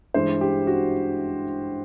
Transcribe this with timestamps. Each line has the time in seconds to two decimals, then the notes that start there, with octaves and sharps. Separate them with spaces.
0.14 G2 E3 G#3 C5
0.41 G4
0.67 F#4